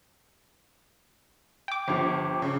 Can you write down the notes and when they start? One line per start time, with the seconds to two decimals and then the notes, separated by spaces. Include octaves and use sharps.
1.68 G5 D6
1.88 G1 F3
2.42 C#3